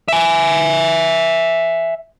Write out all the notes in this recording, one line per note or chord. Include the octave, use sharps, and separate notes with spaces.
E5 G#5